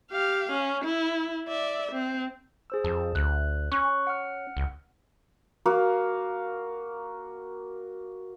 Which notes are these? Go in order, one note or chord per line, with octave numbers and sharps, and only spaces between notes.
G4 F5
C#4
E4
D5 E5
C4
G#4 C5 E6
F2 A5
D2 F#6
C#4 C#6 F#6
F#5 F6
C#2
A#3 F#4 F5